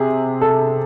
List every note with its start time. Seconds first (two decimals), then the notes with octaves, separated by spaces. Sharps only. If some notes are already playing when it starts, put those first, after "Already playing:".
Already playing: C3 G#4
0.41 A4